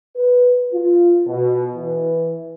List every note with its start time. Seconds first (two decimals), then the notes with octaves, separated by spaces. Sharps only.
0.14 B4
0.73 F4
1.26 B2
1.76 E3